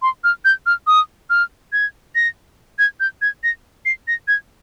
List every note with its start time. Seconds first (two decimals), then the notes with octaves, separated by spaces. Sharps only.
0.02 C6
0.24 F6
0.45 G6
0.66 F6
0.87 D#6
1.30 F6
1.73 G#6
2.15 A#6
2.79 G#6
3.00 G6
3.22 G#6
3.44 A#6
3.85 C7
4.08 A#6
4.28 G#6